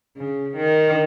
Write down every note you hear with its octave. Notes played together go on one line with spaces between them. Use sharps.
C#3
D#3